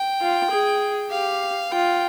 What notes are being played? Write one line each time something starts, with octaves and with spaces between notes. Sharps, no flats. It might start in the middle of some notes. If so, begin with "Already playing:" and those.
Already playing: G5
F4
G#4
G4 F5
F4 G5